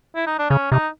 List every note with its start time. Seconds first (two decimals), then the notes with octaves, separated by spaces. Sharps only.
0.16 E4
0.27 D#4
0.39 D4
0.50 C#3 C#4
0.72 C3 D#4